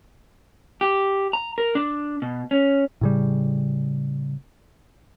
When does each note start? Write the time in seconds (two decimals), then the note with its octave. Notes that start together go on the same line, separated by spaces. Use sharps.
0.81 G4
1.33 A#5
1.58 A#4
1.75 D4
2.22 B2
2.51 C#4
3.01 A2 C#3 G3